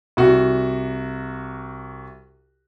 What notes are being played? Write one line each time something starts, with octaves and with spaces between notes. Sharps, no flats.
C2 F#4